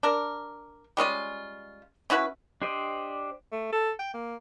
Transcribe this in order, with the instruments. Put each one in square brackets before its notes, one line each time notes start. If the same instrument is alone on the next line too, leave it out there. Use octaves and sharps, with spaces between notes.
[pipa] D4 A#4
G3 G#3 C#4 F4
C#4 E4 F#4 B4
[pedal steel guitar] D4 G4 C5 D5 D#5
[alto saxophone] A3
A4
G5
A#3